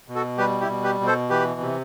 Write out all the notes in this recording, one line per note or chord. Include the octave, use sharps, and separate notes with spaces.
B2
F#4 A4
G3 G4 B4
E4 G4
B2
G4 B4
B2
A4 C5
E3 G4 B4
C3